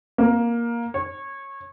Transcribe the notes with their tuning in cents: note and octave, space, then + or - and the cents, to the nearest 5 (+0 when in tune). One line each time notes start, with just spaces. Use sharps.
A#3 +10
C#5 -20